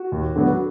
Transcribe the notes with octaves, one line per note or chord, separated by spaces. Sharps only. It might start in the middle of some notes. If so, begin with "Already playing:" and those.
Already playing: F#4
D#2
D3 F#3 B3